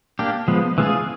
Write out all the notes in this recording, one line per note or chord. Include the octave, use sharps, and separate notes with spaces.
A#3 D4 G4
F3 G#3 B3
E3 G#3 C#4 F4 G#4